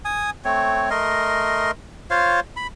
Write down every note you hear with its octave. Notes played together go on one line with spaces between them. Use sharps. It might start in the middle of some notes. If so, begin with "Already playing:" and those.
G#5 D#6
A3 C4 C#5
A3 A#4 D#5 C6
F4 C5 C#5 F5
B5